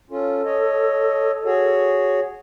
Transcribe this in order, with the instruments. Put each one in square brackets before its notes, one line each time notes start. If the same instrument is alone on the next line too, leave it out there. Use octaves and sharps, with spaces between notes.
[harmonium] C#4 F4 [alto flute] A4
[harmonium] C#5 D#5
F#4 G#4 C#5